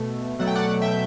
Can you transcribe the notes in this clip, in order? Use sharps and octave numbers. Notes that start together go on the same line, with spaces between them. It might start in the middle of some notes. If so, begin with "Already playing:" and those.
Already playing: B2 A3
B2 F#3 A3 F#5
G5
D5 F#5
E5 G5